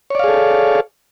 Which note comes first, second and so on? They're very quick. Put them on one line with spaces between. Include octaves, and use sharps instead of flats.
C#5 D5 F5 G#4 A4